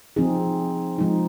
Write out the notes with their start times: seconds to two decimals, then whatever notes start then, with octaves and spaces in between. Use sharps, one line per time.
0.16 F3 C4 D#4 G#4
0.98 F3 G#3 D#4